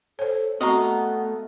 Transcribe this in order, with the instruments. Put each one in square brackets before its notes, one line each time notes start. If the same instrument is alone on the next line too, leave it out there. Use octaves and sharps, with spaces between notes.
[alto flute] A4 [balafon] C5 C#5
[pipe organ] A3 [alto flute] B3 [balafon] C4 F#4 C#6 [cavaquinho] D#5 F5 A#5